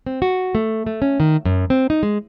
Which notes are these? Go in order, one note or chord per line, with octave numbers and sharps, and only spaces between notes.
C4
F#4
A3
A3
C#4
D#3
F#2
C4
D#4
G#3